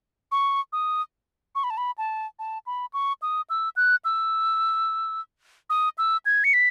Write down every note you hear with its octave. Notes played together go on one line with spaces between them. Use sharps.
C#6
D#6
C#6
B5
A5
B5
A5
A5
B5
C#6
D#6
E6
F#6
E6
D#6
E6
G#6
C#7
B6